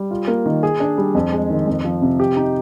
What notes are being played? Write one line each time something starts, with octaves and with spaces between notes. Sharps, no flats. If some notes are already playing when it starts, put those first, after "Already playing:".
Already playing: G3
F4
A#3
D#3
G#4
D4
G3
F2
G#3
D#3
F2
F3
C3
G4
D#4